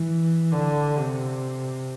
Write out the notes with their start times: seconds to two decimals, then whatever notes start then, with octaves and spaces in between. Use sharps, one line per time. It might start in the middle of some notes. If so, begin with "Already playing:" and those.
Already playing: E3
0.53 D3
0.98 C3